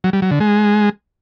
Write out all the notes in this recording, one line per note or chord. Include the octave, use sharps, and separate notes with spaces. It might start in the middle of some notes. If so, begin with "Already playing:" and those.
F#3
G3
F#3
D3
G#3